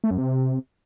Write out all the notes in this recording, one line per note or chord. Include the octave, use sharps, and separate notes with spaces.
A3
F#2
C3